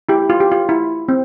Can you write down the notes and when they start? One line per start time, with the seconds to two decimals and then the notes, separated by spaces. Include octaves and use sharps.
0.09 E4 G4
0.30 F4
0.40 G4
0.52 F4
0.69 E4
1.08 C4